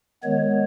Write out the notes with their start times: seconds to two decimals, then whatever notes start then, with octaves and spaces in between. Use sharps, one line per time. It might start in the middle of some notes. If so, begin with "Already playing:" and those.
0.23 D#3 G#3 B3 C#5